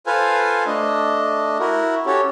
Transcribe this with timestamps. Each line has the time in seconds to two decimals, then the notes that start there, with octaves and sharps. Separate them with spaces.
0.06 F4 A4 B4 C5 F5 G#5
0.66 A3 D4 D#5
1.60 E4 F#4 A#4
2.06 C#4 F#4 G4 A4 C#5